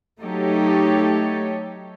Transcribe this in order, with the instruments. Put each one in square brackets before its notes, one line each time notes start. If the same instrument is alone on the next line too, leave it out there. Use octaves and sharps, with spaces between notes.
[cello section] F#3 A3 D#4 G4 A4 C#5